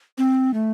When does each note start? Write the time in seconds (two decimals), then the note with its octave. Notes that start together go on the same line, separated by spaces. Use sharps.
0.18 C4
0.54 A3